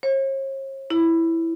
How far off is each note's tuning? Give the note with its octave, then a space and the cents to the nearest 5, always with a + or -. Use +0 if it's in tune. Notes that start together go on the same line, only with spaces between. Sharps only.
C#5 -45
E4 +0